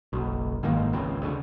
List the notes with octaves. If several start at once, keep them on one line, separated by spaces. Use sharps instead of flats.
F#1 B1
F#1 G#2 D#3 A#3
G#1 C#2 C#3 C4
D2 C#3